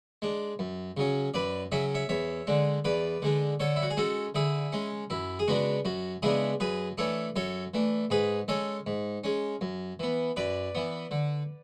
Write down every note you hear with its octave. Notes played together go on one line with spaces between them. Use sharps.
G#3 D4
F#2
C#3 F#3 C#4
F#2 B4 D5
C#3 F#3 C#4 E5
C#5 E5
E2 C#5 E5
D3 G#3 D4
E2 B4 D5
D3 G#3 D4
D3 A4 C#5
E4
F#4
G#4
G#3 C#4 F#4 A4
D3 E4 G#4
G#3 C#4
F#2 E4
G#4
C#3 G#3 B3 D4 F#4
F#2 F#4
C#3 G#3 B3 D4 E4 G#4
F#2 G#4 B4
E3 A3 D4 A4 C#5
F#2 A4 C#5
E3 A3 D4
G#2 G#4 B4
G#3 C#4 A4 C#5
G#2
G#3 C#4
F#2
E3 B3
F#2 B4 D5
E3 B3
D3